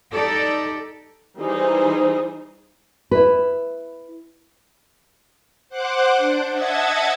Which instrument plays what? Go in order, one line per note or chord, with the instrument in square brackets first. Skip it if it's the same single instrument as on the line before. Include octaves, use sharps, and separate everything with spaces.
[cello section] D#4 G4 A4 D5
[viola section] E3 G3 D#4 G#4 C5
[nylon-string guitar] E4 B4
[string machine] C5 F#5 D6 F#6
D4
D#5 E5 F#5 A5 G#6 A6